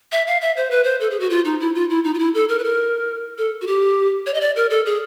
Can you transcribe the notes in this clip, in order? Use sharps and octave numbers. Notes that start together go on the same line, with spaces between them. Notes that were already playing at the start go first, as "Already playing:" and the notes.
E5
F5
E5
C5
B4
C5
A4
G#4
F#4
F4
D#4
E4
F4
E4
D#4
F4
E4
A4
A#4
B4
A#4
A4
F#4
G4
C#5
D#5
D5
A#4
A4
G#4